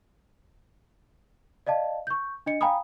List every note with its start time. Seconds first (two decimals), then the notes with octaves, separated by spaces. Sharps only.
1.67 D5 D#5 F5 A5
2.07 C#6 G6
2.46 D4 D#5 C#7
2.61 F5 G5 G#5 A#5 B5 D#6